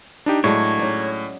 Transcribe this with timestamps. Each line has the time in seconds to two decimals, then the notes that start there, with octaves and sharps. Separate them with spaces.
0.26 D4 D#4 G4
0.44 A2 F#3 G#3 D4 C#5
0.79 C#4 D#4 D5